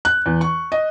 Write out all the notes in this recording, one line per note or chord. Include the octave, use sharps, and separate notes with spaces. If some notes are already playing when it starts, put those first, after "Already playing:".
F#6
E2
C#6
D#5